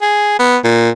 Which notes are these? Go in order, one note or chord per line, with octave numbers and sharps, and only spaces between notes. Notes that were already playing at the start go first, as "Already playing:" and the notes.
G#4
B3
A#2